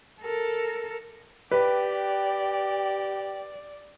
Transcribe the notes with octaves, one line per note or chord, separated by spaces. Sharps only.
A4 A#4
G4 B4 D5 G5